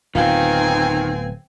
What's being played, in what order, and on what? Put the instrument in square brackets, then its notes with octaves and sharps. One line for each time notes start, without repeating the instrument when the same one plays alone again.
[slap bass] D1 [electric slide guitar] D#3 [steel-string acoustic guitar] B3 F4 [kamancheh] C4 G#5